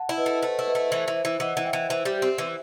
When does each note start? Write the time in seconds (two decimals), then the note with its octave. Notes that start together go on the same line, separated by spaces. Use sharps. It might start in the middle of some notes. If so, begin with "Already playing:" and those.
Already playing: F#5 A5
0.09 E4
0.17 B4 D#5
0.26 A3
0.42 A3 C5
0.59 E4
0.67 B4 D#5
0.75 A3
0.91 E3 C5 E5
1.08 E3
1.16 C5 E5
1.25 E3
1.40 E3 D#5 F#5
1.55 E3 F#5
1.65 E5 G5
1.73 E3
1.89 E3 C5 E5
2.05 G3
2.22 C4
2.38 E3